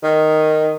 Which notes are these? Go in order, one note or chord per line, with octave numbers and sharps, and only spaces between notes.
D#3